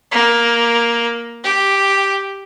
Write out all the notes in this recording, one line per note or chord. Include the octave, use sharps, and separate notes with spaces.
A#3
G4